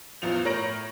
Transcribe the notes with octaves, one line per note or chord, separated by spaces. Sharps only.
A1 E2 F3 F4 F7
A2 A#4 C#5 A#6 D7 F#7